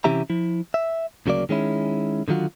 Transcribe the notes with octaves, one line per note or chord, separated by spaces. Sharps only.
C3 E3 C#4 G4 E5 A#5
F3 E4
E5
D2 C#3 F#3 A#3 D5
D#3 G#3 C#4 E4
D3 D#3 F#3 F4 F#4